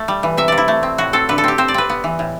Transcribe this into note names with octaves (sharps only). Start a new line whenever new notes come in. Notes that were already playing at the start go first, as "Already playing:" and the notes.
Already playing: A3
G3
E3
C3 E5
C3 D5
E4
A3
C4
A2 F#4
C4 A4
D3 B4
A4
C4 G4
C4 C5
D5
C4 B4
B3
E3
A2